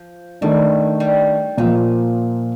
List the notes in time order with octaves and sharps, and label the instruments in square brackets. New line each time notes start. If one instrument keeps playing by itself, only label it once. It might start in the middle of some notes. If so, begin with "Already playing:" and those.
Already playing: [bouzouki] F3
[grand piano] D#3 A3 D4 [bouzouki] G3
[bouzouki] G3
[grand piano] A#2 F3 A#3 [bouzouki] D#3